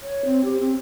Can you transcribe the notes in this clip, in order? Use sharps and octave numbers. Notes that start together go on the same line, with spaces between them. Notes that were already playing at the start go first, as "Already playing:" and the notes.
C#5
C4
G4
C4